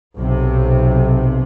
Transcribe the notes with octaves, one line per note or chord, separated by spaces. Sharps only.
B1 C3